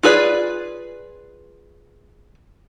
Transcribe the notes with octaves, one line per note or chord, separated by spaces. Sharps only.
F4 G#4 B4 D5